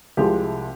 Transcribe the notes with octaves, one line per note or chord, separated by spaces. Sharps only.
C2 C3 F3 G#3 G4